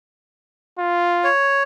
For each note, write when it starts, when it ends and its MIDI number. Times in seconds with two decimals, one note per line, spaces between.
0.79 1.30 65
1.24 1.63 73